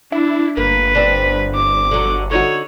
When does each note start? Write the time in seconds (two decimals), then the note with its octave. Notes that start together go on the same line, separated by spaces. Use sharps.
0.12 D4 E4
0.57 G1 A#3 B4
0.95 C4 D4
1.55 D6
1.91 D3 F#3
2.31 D3 D#4 F#4 C#5